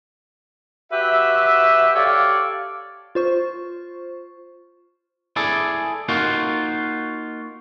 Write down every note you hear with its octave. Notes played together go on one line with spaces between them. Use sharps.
F#4 G4 B4 E5
G4 A4 C#5 D5 F5
F4 C5 C#6
E4 G#4 A4 D5
A#3 D#4 F4 F#4